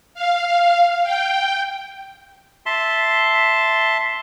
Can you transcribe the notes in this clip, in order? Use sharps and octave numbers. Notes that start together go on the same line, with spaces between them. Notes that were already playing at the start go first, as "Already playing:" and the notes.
F5
G5
E5 A5 C6